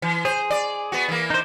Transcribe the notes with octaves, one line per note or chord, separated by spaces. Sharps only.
E3
G#4 C5
D5
B3 F#4
E3 A#3
D#4 C5